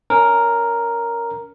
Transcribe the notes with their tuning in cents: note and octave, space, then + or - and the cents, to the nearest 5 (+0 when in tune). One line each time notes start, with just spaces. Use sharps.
C#4 +20 A#4 +0